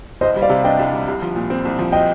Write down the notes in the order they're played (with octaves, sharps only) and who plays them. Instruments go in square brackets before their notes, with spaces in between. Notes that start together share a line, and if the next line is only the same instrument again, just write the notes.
[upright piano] C2 [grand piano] C5 D#5
[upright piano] G3
[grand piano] D5 F5
[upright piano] C3
[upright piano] D4 [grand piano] D#5 G5
[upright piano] C2
G3
C2
F3
A#2
C4
C2
F3
[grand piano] D#5 G5